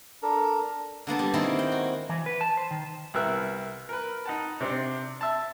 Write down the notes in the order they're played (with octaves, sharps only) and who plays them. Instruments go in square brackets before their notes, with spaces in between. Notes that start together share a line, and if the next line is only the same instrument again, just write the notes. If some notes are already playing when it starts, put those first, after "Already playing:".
[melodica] D4 A4 A#4
[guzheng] D3 A#3 B3 A5
G3
D#3 G#3 A#3 C4 E4
G5
F#4
[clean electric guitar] E3
B4
A5
C5
D#3
[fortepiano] C2 B3 A#4 E5 F#6
A#4 B4
D#4 F#5 A5
C3 C4 D4
E5 A5